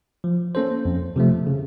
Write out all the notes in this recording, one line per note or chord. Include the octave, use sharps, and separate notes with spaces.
F3
A#3 C#4 A4 C5
F2
C3 F3 A3
C#3